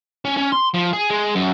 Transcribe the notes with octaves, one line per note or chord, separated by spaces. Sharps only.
C#4
C#4
C6
F3
G#4
G#3
F#2